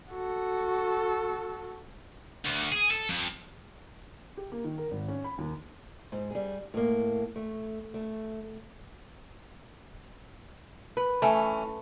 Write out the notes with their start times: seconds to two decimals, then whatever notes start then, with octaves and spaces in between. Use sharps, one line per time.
0.12 F#4 A4
2.45 D2
2.72 G#4
2.91 A4
3.09 F2
4.37 G4
4.52 A#3
4.64 D#3
4.78 A#4
4.91 G#1
5.08 C#4
5.24 B5
5.38 D#2
6.12 G#2
6.31 G3 G#4
6.74 A2 A#3
7.36 A3
7.94 A3
10.97 B4
11.22 E3 A3 C#4